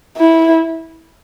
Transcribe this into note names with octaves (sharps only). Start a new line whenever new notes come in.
E4